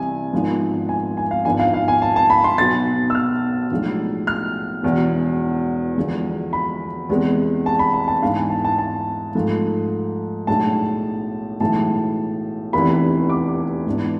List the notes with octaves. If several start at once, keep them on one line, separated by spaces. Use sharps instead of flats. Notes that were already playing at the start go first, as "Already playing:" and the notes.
Already playing: C2 C3 E3 G#5
G#1 G#2 F3 B3
G#5
G#5
F5
G#1 G#2 F3 B3 D4 G#5
F5
F5
G#5
A5
A5
B5
C6
B1 B2 B3 A6
E6
F6
B1 A2 F3 G#3 D4
F6
E1 E2 B2
E2 D3 F3 G#3
B5
E2 C3 G#3 B3
A5
B5
B5
A5
G#2 E3 B3 D4 F5
G#5
A5
A5
A5
G#2 F3 A3
B1 A2 G#3 D4 A5
B1 A2 E3 G#3 A5
F1 E2 C3 E3 B5
D6
G#2 E3 B3 D4